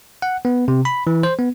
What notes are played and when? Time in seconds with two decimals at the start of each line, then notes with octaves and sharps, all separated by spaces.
0.22 F#5
0.45 B3
0.68 C3
0.85 B5
1.07 E3
1.23 C5
1.39 B3